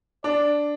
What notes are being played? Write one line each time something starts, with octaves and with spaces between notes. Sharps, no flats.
D4 D5